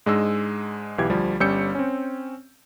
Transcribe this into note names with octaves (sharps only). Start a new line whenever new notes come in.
G#2 G#3 D4 D#5 E6
B1 E3 G4 G#6
D2 F3 G3
G1 G3 C#4 E6 G6 C#7
C4 C#4